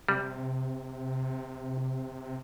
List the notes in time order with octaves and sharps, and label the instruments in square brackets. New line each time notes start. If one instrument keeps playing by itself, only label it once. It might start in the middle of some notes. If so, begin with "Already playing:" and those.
[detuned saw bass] C3 [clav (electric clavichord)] G3